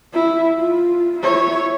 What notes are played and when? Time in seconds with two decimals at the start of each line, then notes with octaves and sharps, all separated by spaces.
0.13 E4
0.58 F4
1.19 E4 C#5